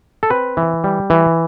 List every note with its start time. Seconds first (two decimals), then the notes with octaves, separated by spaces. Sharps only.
0.23 A4
0.30 C4 B4
0.57 E3
0.84 G3
1.10 E3